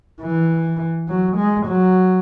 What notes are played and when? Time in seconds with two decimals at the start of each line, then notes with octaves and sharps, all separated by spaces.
0.22 E3
1.08 F#3
1.37 G#3
1.67 F#3